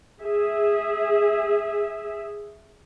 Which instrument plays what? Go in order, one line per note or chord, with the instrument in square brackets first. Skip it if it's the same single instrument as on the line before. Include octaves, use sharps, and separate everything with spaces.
[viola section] G#4 E5